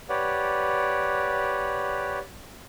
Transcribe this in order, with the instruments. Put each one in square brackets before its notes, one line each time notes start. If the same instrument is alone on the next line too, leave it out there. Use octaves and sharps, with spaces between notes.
[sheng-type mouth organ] G4 B4 C#5 D5 F#5